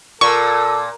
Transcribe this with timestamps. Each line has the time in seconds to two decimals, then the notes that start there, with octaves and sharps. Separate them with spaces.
0.21 A#2 A4 C#6